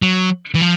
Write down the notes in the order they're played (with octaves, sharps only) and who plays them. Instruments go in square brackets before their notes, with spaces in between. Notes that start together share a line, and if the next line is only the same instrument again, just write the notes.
[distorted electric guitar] F#3
E3
F3